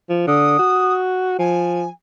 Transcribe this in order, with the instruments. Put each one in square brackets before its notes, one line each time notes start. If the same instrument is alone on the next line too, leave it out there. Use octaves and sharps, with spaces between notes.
[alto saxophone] F3
[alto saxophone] D3 [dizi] D#6
[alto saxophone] F#4
[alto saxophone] F3 [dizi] G#5